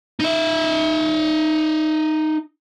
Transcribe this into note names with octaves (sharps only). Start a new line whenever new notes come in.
D#4 E5